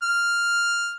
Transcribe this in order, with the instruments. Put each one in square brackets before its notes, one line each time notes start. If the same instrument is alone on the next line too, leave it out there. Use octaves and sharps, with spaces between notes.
[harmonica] F6